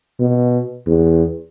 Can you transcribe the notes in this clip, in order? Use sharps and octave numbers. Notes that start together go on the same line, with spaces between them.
B2
E2